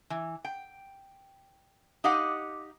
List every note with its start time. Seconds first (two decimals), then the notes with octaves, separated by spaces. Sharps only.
0.10 E3
0.45 G5
2.04 D#4 G4 D#5 F5 F#5